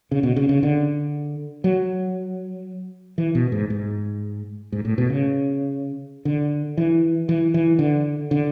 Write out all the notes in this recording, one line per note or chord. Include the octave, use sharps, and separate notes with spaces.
C#3
B2
C#3
C#3
D3
F#3
E3
B2
G#2
G#2
G#2
A2
B2
C#3
D3
E3
E3
E3
D3
D3